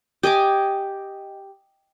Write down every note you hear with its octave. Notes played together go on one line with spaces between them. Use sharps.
G4 D#5 G#5 D6